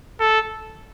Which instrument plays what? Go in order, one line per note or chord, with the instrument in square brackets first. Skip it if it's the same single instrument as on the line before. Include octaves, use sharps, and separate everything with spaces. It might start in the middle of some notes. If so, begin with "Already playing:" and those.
[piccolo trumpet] A4